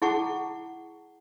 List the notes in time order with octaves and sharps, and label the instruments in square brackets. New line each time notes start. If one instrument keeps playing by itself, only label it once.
[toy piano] E4 G#4 F#5 A5 C#6